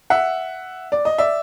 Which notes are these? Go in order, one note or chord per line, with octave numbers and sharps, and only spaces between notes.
E5 F#5
D5
D#5
D5 E5